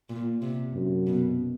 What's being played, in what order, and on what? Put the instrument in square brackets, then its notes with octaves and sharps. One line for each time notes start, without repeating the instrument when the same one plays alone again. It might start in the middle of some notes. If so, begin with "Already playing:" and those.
[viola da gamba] A#2
C3
[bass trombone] F#2
[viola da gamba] B2